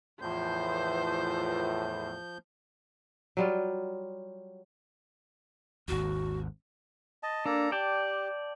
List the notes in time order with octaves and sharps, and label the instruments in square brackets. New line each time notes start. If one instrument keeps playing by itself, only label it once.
[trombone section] E2 A2 [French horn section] E3 F4 [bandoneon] F3 G6 [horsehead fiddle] C5
[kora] F#3 G3 F4
[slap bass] G#1 D#2 [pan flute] F#4
[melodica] D#5 A5
[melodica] A#3 A4 A#5 [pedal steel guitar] D4
[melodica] G4 [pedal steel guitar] D5 G5 A5